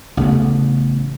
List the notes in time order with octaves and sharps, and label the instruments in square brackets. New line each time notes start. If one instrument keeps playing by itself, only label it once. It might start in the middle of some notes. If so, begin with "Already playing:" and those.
[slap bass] A1 C#3 A3 B3